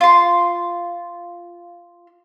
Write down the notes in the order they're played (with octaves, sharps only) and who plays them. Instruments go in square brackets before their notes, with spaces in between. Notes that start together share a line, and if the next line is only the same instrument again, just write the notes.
[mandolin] F4 C6